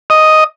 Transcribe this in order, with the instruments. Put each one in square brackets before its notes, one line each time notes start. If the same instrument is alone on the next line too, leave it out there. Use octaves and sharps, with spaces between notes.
[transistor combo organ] D#5